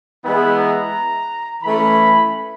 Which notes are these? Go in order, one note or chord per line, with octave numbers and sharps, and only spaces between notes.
E3 G#3 B3 E4 B5
A#5
E3 A3 C#4 B5